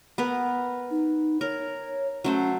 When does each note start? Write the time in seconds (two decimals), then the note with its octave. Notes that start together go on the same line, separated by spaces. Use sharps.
0.18 B3 A#4 B4
0.91 D#4
1.41 A#4 C#5
2.24 F#3 A3 C#4 C5